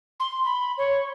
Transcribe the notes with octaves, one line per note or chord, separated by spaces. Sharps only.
C6
B5
C#5